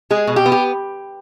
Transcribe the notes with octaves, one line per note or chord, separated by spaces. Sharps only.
G#3 G#4
B2
G4
B3
G4